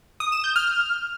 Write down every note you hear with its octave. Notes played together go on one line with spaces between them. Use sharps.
D#6
E7
G6
F6